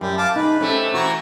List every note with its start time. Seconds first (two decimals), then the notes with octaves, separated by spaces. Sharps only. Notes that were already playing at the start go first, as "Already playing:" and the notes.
0.01 F#2 G3
0.17 F5 A5 D6
0.36 D#4 G#4 B4
0.61 C3 A3 C#4
0.94 E3 F#4 A#5 C#6